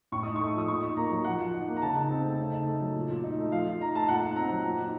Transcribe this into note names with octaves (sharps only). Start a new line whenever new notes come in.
A2 C#6
D#4 D#6
A3 C#6
F3 D#6
A#2 C#6
D#4
A#3 A#5
F#3
F3 F#5
F3
D#4
A#3
A#5
C#3 A5
D#4
C4
A3
C#3
D#4
A3
F#3
A#2
A#2
D#4
A3
F3 F5
F3
D#4 A#5
A3 A5
A#2 F#5
D#4
C4 A#5
F#3
A#2
D#4